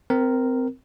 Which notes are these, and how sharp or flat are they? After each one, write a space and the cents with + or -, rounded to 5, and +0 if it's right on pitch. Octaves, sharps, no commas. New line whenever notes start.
C4 -20 A#4 +0